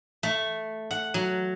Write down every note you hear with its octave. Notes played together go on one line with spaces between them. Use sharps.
A3
F#5
F#3